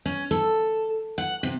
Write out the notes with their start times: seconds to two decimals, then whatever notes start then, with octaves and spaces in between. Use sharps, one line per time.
0.06 C#4
0.31 A4
1.18 F#5
1.43 C3